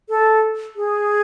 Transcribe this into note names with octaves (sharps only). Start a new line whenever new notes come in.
A4
G#4